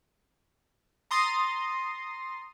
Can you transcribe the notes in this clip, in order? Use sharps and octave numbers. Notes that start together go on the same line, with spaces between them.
A#5 C6 D#6 A6